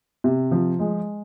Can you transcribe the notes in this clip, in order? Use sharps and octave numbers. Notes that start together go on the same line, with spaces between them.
C3
F3
G#3